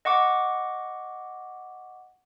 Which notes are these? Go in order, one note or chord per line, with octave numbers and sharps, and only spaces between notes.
D#5 F#5 C#6 D6